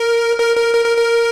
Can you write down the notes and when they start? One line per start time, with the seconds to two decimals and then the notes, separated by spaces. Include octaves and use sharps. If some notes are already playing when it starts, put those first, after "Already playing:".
Already playing: A#4
0.40 A#4
0.56 A#4
0.74 A#4
0.85 A#4
0.97 A#4